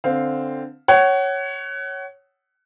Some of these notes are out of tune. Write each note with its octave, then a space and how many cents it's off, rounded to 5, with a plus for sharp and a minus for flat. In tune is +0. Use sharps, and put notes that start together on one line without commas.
D3 +0 C4 +0 F5 +0
C#5 +0 F#5 +30